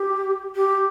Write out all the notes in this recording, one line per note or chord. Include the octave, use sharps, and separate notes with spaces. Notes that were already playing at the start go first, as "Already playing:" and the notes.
Already playing: G4
G4